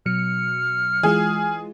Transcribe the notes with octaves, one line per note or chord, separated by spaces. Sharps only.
B2 F#3 F6 C#7
E3 G#3 F4 G#4